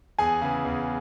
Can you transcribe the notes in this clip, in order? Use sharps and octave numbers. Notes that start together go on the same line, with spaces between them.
E2 G#4 G#5
C#3 E3
E2